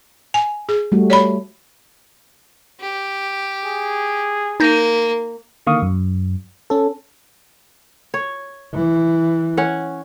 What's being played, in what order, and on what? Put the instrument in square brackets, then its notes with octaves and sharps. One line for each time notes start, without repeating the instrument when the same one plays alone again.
[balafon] G#5
G#4
[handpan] G3 A3 F#4
[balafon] C#5 D5 B5
[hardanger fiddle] G4
[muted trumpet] G#4
[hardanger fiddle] A#3 [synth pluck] D#4 G6 A#6
[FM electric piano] D3 D#3 A#3 F5 C#6 D#6
F#2
C#4 A4
[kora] C#5
[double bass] E3
[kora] C#4 C#5 F#5